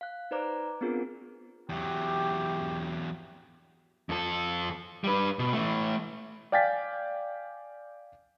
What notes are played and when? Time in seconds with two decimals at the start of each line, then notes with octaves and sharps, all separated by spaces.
0.01 F5 F#6
0.31 D#4 B4 C5 D5 A#5 D6
0.81 B3 C4 D4 F4 G#4 A#4
1.69 E2 F#3 G4
4.09 F2 A4
5.04 G3 B4
5.39 B2
5.53 E3 A3
6.52 D5 F5 G5 G#5 A6 B6